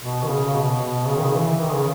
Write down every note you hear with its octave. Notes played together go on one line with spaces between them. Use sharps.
B2
D#3
C#3
C#3
B2
B2
C#3
D#3
C#3
E3
D#3
C#3